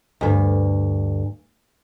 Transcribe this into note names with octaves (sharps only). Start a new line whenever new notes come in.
D2 G2